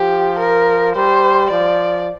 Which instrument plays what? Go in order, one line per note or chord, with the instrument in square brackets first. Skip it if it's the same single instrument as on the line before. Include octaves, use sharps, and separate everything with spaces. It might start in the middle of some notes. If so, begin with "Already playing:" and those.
Already playing: [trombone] F3 [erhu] G4
[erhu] A#4
[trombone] G3 [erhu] C5
[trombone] F3 [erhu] D5